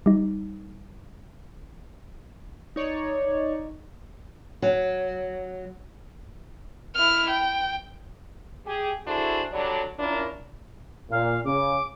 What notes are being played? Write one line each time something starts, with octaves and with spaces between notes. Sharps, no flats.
G3 D#4
D#4 C#5 D5
F#3
E4 F6
G5
G4 G#4
D4 E4 F#4 G#4 A4 C5
D3 F#3 G3 D4
C#4 D4 E4 F4 A#4
A#2 F5
C#3 D6